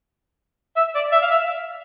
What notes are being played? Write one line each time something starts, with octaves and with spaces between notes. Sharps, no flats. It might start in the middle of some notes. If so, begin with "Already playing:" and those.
E5
D5
E5
F5
E5